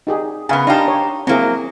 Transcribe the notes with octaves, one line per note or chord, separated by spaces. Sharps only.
D#4 G4 G#4
C#3 B3 F5 G#5
D4 D#4 G4 F5 A5
C#5
F#3 A#3 C4 E4 G#4